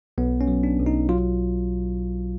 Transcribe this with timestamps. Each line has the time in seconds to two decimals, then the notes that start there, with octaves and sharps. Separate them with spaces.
0.18 B1 B3
0.41 C#4
0.48 F#3
0.63 D4
0.79 B1
0.86 D#4
1.09 F#3 F4